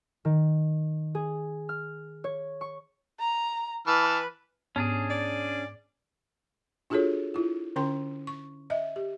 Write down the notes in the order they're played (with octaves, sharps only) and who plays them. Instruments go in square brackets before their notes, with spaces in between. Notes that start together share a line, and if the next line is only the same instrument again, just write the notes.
[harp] D#3
G#4
F6
C#5
C#6
[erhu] A#5
[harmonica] E3 A5 F6 [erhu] B4
[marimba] G#2 B3 [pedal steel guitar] C#4 D4 G#4
[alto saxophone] D5
[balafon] D4 F4 F#4 G#4 A4 C#5
E4 F4
D3 C#4 A#4 G5 C6
C#6
D#5 E5
G4